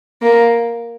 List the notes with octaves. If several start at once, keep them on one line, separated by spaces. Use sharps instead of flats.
A#3